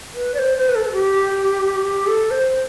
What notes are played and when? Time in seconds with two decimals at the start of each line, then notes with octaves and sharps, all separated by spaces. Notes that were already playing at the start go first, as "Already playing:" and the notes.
0.15 B4
0.34 D5
0.39 C5
0.57 C5
0.69 B4
0.75 A4
0.85 A4
0.92 G4
1.83 G4
2.07 A4
2.31 C5